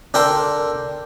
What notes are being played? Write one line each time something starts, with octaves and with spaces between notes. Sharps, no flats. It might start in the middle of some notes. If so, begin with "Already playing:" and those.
D4 A4 A#4 G5 C6